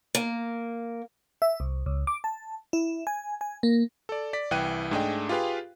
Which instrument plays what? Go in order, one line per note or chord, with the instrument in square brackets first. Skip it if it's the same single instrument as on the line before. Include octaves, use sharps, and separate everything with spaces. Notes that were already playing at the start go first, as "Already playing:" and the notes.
[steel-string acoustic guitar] A#3
[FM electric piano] E5
C2
C#2
D6
A5
E4
G#5
G#5
A#3
[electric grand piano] A4 D5
D5 B6
C2 E3 G5 F#6 D#7
G#2 A3 D4 G#4 D#5 G5
F4 G4 G#4 B4 F5 G5